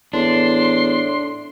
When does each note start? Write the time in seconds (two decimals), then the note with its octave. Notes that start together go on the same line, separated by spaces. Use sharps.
0.13 E2 A2 D4 C6